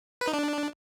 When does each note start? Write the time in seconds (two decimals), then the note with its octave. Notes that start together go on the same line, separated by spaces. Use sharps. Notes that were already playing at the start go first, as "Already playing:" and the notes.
0.21 B4
0.27 D#4
0.34 D4